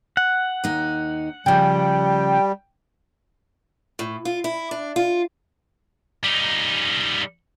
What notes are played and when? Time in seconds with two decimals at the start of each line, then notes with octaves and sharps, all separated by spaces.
0.17 F#5
0.64 D#2 D#4
1.46 C#3 F3 G3 G5
3.99 A2
4.25 F4
4.44 E4
4.71 D4
4.96 F4
6.23 G3 D#4